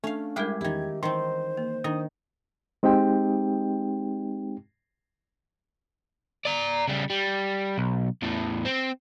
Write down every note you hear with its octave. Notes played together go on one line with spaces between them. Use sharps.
A3 C#4 D4 F5
G3 G#3 E4 G4 G#4 A#4
E2 D#3 E4 G4 G#6
D#3 E3 C4 C5 C6
A#3
D#3 D4 D#6
G#3 C4 D#4 G4 G5
D5 A#5
C#3 G3
G3
B1
E2 A2
C4